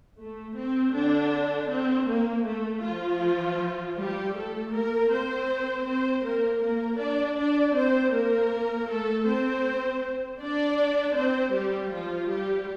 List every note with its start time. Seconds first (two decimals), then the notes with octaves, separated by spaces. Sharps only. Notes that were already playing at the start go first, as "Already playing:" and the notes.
0.19 A3
0.57 C4
0.94 D3 D4
1.70 C4
2.08 A#3
2.46 A3
2.84 F3 F4
3.97 G3 G4
4.35 A3 A4
4.73 A#3 A#4
5.10 C4 C5
5.86 C4 C5
6.24 A#3 A#4
6.62 A#3 A#4
6.99 D4 D5
7.37 D4 D5
7.75 C4 C5
8.12 A#3 A#4
8.88 A3 A4
9.26 C4 C5
10.40 D4 D5
11.15 C4 C5
11.53 G3 G4
11.91 F3 F4
12.29 G3 G4